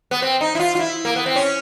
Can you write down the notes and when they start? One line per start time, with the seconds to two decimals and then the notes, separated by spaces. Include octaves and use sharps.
0.11 B3
0.22 C4
0.41 D#4
0.55 E4
0.60 F4
0.75 F4
0.79 E4
1.05 A#3
1.16 B3
1.26 C4
1.36 C#4